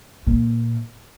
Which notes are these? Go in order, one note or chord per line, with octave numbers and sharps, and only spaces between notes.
A#2